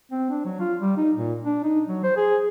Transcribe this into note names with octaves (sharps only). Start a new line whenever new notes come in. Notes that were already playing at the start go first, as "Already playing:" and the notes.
C4
D4
F#3
F4
G3
D#4
A#2
D4
D#4
F#3
C5
G#4